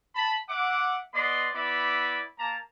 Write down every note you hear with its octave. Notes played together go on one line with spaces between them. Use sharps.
A5 B5
E5 F#5 D6
B3 D5 D#5 C6
B3 E4 D5 E5 B5 D6
A#3 A5 A#5